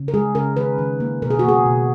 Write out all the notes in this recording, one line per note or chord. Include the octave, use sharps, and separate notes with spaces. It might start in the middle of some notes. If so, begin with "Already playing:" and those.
Already playing: C#3
A#4
G#3 G#4
C#3 A#4
D#3 B4
D#3
A#3
B2 A#4
G#4
F#4
A#3 G#4
B2